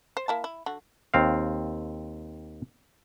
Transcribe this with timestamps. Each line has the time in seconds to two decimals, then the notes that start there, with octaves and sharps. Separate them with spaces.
0.17 C5
0.28 A#3 E4 A5
0.44 E4
0.66 D3 F#4
1.14 D#2 C4 F5